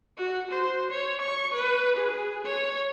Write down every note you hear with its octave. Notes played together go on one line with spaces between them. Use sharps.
F#4
C5
C#5
C#6
B4
G#4
C#5